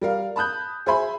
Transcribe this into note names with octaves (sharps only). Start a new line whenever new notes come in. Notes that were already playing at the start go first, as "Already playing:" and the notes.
G3 A#4 F5
A5 B5 D#6 F#6 G6
G#4 C5 E5 G#5 B5 C6